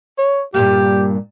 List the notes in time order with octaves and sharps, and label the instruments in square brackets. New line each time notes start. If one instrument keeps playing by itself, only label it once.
[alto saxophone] C#5
[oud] G2 A#2 A#3 [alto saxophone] G4